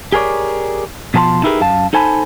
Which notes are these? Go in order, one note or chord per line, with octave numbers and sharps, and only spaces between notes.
G4 G#4 A#4 C#5 D5
B2 F3 A4 C5 A5 C6
D#4 E4 G4 G#4 A#4 B4
F#2 F5 A5
D#4 A4 C5 G#5 A5 B5